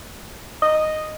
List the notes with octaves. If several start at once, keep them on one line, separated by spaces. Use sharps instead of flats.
D#5